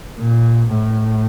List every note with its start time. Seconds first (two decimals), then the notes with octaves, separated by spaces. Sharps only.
0.19 A#2
0.73 A2